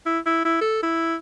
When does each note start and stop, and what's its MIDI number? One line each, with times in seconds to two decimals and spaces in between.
0.06 0.19 64
0.26 0.42 64
0.45 0.57 64
0.61 0.81 69
0.83 1.16 64